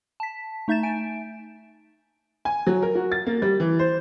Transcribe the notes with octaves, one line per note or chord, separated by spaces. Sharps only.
A5 B6
A3 D#4 E5 G6 A6 E7
G#5 D7
G#5
F#3
A#4
F#4
A6
A#3
G3
E3
C5